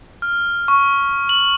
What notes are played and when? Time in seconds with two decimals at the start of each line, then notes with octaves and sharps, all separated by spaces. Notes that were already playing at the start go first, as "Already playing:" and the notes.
0.22 F6
0.68 C#6
1.29 F#7